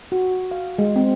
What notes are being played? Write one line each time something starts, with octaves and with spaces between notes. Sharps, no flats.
F#4
F5
G#3
C4